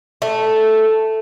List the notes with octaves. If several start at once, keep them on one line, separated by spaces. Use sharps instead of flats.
A3